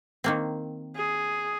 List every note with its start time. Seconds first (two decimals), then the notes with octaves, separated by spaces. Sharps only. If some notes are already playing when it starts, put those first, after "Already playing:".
0.24 D#3 A#3 C4
0.96 G#4